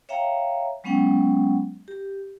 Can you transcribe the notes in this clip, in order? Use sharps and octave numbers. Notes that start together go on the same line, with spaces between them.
C#5 E5 F5 G5 A#5
F#3 G#3 B3 C#4 F#5 G5
G4